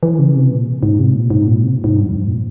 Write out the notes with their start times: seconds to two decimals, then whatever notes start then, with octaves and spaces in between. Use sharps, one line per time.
0.03 E3
0.19 C#3
0.35 C3
0.51 A#2
0.83 G#2
0.99 C3
1.15 A#2
1.30 G#2
1.47 A#2
1.63 C3
1.84 G#2
1.94 G2
2.05 F2
2.16 G2
2.27 A#2